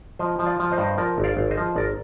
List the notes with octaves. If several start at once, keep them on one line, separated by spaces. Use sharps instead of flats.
F3 C5 D#5
F3
D5 F5
F3
C5 D#5
G2
F3 A#4 D5
G#1
D5 F5
G#1
C5 D#5
F3
G#1 A#4 D5